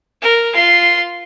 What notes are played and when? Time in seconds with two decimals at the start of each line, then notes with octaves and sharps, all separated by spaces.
0.22 A#4
0.54 F4 C6